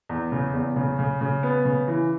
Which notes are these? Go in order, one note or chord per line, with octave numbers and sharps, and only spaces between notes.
E2
C#3
E2
C#3
C#3
C#3
B3
C#3
E3